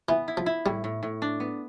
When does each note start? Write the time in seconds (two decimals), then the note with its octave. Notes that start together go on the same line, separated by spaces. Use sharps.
0.09 E3 B3
0.28 E4
0.37 F3
0.46 E4
0.66 A2 G3
0.84 A2
1.03 A2
1.22 D4
1.40 B3